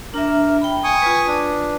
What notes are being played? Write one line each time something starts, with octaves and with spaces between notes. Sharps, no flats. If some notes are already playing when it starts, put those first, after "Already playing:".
D4 A#4 E5
G5 B5
G#5 C#6 D#6
F4 B4
D4